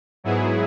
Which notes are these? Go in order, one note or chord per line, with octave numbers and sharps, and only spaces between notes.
G#2 F#3 B3 E4 G#4